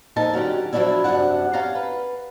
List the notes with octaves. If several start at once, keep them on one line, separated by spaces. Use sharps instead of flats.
A#2 F3 D#4 A4 A#4 A5
D3 F#3 C#4 G4
F3 F#3 A#3 C#4 D4 E4
F#2 C3 F3 D4 F#5
C#4 F5 A5 A#5
B4